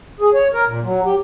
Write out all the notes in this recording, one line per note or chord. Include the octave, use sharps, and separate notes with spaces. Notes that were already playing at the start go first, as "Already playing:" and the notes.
G#4
C#5
A#4
A#2
F#3
G4